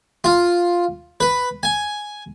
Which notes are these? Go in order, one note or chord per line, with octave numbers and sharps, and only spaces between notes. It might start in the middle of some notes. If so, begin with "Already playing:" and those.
F4
B4
G#5